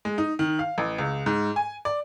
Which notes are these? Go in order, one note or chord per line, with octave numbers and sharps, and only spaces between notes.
G#3
D#4
D#3
F5
A1
C#2
G#2
G#5
D5